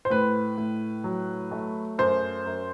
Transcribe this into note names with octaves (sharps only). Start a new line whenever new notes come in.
C5
A2 B4
A2
F#3
A3
F#2 C5
F#2